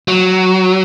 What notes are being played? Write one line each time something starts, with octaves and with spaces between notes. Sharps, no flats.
F#3